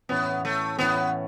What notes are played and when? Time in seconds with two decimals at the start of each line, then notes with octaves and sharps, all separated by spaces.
0.09 A2 E3 B3 C#4
0.45 A3
0.79 A2 E3 B3 C#4